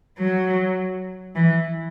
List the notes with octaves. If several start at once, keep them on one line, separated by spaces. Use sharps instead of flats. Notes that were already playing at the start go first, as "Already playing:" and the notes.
F#3
E3